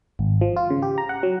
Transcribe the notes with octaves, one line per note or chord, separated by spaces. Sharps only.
G#1
F3
F4
C#3
G4
A#5
F#5
F#3